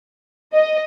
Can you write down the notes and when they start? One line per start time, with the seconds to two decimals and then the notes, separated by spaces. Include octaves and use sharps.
0.54 D#5